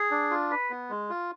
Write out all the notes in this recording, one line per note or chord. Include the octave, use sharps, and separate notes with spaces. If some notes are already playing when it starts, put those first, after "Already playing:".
Already playing: G#4
D4
F4
B4
B3
G#3
F4